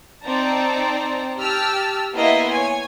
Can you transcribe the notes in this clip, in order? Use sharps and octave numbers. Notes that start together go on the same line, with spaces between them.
C4 D#4 D5 A5 A#5
G4 A5 E6 F6
A#3 B3 E4 D#5 E5 C6
C#5 G#5